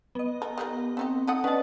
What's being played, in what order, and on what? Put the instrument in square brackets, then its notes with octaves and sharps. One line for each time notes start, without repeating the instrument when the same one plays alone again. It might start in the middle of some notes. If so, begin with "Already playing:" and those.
[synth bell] B3 D#5
[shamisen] A4 A#4
[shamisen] D#3 G3 A#4 [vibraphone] G4
[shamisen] A3 D#4 G4 [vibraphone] C4
[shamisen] D#4 A4 F#5 [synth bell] D#6
[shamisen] B3 D4 [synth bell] C#4 F#5 A5 [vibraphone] B4 D5 D#5